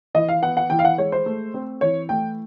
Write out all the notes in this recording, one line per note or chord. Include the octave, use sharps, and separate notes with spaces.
E3 D#5
F5
B3 F#5
F#5
E3 G5
F5
F#5
G#3 C#5
C5
A3
C4
E3 C#5
A3 G5